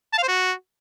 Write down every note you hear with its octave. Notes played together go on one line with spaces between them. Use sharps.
A5
F5
C5
F#4